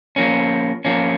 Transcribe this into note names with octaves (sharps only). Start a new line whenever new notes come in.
F3 A#3 C#4
F3 A#3 C#4